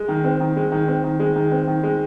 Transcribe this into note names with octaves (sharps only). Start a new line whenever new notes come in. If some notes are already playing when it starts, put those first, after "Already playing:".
Already playing: G#3
D#3
C4
D#3
G#3
D#3
C4
D#3
G#3
D#3
C4
D#3
G#3